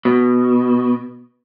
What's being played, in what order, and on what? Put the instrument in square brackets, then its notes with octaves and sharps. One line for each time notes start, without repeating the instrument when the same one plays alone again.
[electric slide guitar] B2